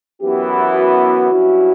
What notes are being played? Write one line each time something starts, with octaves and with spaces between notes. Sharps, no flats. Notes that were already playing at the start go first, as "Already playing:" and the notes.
F#2 E3 B3 E4 G4
F#4
G2 F#3 C#4 E4